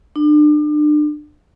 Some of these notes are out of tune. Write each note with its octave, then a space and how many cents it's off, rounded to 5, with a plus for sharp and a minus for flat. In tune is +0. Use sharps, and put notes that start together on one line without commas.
D4 +35